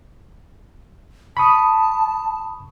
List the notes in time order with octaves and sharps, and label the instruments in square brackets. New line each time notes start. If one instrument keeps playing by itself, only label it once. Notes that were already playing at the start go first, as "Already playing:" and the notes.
[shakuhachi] A5 [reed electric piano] B5 C#6 D#6